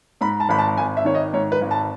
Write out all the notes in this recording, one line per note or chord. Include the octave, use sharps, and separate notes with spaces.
G#2 B5
A5
G#1 B5
A5
G#1 G#5
E5
D#3 C#5
D#5
G#2 C#5
B4
G#1
A5